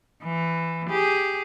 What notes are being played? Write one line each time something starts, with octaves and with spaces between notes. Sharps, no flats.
E3
G4 G#4